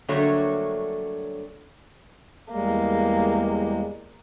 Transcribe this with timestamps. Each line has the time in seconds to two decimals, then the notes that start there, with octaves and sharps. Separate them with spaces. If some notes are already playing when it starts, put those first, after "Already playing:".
0.08 G2 D3 F#3 A3 A#3 C#5
2.52 E2 G3 G#3 A#3